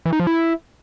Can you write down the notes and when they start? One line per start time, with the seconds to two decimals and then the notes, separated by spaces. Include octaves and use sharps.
0.06 E3
0.13 D#4
0.20 F3
0.27 E4